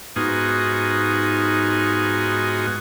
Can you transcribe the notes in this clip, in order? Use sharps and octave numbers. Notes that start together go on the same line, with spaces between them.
G#2 B3 D#4 F4 F#4 G#5